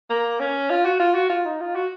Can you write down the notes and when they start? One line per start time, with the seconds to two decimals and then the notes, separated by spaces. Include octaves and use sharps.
0.10 A#3
0.40 C#4
0.70 F4
0.85 F#4
1.00 F4
1.15 F#4
1.30 F4
1.45 D#4
1.61 F4
1.75 F#4